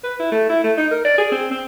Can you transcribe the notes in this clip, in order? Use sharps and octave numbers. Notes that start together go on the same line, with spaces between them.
B4
E4
A3
E4
A3
D#4
A#4
D5
G#4
C4
C4